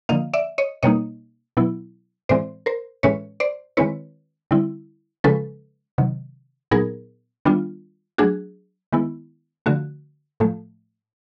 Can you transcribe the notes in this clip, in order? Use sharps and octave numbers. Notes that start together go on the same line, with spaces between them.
D3 F3 A#3 D#5 F5
D5 E5
C#5 D#5
B2 G3 A#3 D#4 C#5 D#5
B2 F#3 B3 E4
A2 E3 G#3 C4 C5 D5
A#4 C5
A2 E3 G#3 C#4 B4 C#5
C5 D5
D#3 G#3 C4 E4 B4 C#5
D3 G3 C4 E4
C#3 F3 G#3 C#4 A4 B4
C3 D#3 F#3
A#2 F#3 B3 D#4 G#4 A#4
D#3 G3 B3 D4 F4
F#3 A3 D4 F#4 G#4
D#3 G#3 B3 E4
D3 F3 A3 F#4
A2 F3 A3